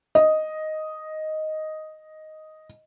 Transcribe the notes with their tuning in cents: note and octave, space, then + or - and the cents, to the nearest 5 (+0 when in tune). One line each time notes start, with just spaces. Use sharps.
D#5 +0